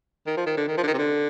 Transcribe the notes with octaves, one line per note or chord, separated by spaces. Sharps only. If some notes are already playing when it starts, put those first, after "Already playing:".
D#3
F3
D#3
D3
D#3
F3
D3
D#3
C3
D3